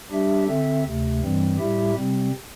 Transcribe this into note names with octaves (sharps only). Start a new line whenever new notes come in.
G3 D4 G4 E5
D3 C4 A4 E5
D2 C3 A3
G2 E3 G3 C4
A2 G3 E4 G4 E5
C3 G3 C4